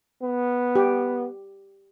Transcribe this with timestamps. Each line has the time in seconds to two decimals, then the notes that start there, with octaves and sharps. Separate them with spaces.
0.22 B3
0.76 G4